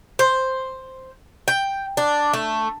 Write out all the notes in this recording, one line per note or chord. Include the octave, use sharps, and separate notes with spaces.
C5
G5
D4
A3